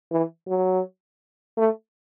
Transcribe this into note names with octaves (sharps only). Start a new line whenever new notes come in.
E3
F#3
A3